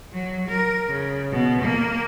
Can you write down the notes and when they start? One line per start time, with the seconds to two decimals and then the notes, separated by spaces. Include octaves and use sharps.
0.13 F#3
0.49 A#4
0.89 C#3
1.32 B2
1.62 A#3